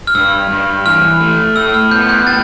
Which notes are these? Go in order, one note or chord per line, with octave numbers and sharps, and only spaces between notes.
F6
G2 E6
G2
E3 F6
A3
A2 E6
F6
B3 G6
G6
A2 A6